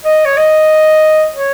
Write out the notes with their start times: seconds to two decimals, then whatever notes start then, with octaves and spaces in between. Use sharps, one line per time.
0.05 D#5
0.25 C#5
0.37 D#5
1.33 C#5